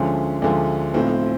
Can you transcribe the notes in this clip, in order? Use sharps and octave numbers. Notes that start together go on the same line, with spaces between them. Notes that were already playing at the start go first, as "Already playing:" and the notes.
Already playing: D2 D3 F3 G#3 C#4
D2 D3 F3 G#3
B1 A2 F3 C4